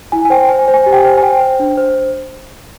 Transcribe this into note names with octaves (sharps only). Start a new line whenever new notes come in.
E4 G#5
G#5
C5 G5
C5 G#5
C5
G#5
G4
G5
G#5
C5
G#5
C5 G5
C5
D4
C5